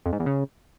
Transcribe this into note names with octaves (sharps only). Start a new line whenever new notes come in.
F2
G#2
E2
C#3